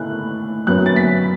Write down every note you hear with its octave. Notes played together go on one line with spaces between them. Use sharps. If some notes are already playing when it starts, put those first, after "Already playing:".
Already playing: A2 A3 F#6
F#2 F#3 B3 F#6
A6
B6